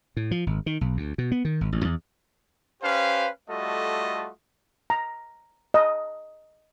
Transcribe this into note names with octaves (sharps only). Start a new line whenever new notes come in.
A2
F3
G#1
D#3
B1
D2
B2
B3
D#3
G#1
A1
E2
C#4 G4 B4 C5 F5
G3 A3 F4 F#4 A4 D#5
A#5
D#5